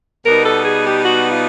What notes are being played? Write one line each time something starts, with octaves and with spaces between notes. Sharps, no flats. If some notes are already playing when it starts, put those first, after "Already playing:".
B2 G3 B3 D#4 A#4
A4
G#4
G4
F#4
F4